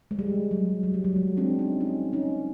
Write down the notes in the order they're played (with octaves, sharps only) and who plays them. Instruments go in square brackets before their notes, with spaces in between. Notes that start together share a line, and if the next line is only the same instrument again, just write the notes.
[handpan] G#3
G3
F#3
F#3
G3
F#3
G#3
C4 D4
C#4 D#4
C#4 D#4
C#4 D#4